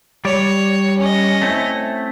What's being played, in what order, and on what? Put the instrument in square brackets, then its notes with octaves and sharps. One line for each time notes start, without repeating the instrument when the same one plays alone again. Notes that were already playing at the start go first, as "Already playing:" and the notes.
[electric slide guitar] G3 D5 [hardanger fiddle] C#5
[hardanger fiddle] C#4 D#5
[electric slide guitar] A3 C4 E4